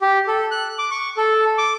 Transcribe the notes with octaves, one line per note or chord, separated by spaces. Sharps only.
G4
A4
F#6
D6
C#6
A4
D6